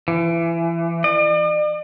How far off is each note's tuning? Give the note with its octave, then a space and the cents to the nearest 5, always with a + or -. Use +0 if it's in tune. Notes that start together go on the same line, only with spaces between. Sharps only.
E3 +30
D5 +45